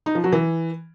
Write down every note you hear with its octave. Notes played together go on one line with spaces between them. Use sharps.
D#4
F3
F#3
E3